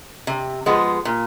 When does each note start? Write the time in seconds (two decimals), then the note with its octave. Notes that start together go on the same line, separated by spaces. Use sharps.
0.27 C3
0.66 F3 G#3 B3
1.05 A#2